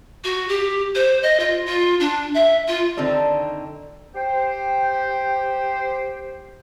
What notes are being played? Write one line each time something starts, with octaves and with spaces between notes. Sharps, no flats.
F#4
G4
C5
D#5
F4
F4
D4
E5
F4
D3 D#3 C4 D4 D#4
G4 C5 G5